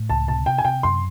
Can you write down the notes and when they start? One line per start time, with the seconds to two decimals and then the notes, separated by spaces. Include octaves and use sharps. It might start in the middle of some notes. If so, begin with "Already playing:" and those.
Already playing: A2
0.09 C#2 A5
0.28 C3 A5
0.46 C3 G5
0.58 G#5
0.65 C3 G5
0.83 F#2 C6